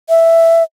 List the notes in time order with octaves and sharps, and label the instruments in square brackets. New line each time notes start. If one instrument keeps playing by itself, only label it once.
[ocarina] E5